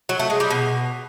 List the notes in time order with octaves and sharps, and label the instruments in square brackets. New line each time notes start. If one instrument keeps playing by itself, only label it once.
[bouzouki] F#3
A3
G#3
G3
B2